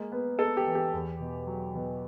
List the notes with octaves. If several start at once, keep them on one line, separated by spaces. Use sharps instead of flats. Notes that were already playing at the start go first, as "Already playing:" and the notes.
Already playing: G#3 A#3
B3
B3 A4
G4
E3
G4
E2
B2
F#3
B2